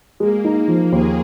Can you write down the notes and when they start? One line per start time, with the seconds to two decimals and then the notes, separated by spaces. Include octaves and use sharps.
0.20 G#3 A#3
0.45 D#4
0.68 F3
0.92 D#2 G#4